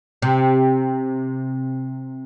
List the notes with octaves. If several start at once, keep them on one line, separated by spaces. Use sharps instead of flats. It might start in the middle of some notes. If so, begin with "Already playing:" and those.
C3